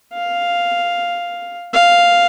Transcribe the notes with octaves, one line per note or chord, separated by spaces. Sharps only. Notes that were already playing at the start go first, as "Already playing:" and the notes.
F5
F5